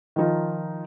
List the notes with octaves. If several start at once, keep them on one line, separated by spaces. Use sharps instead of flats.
D#3 F3 D#4 F4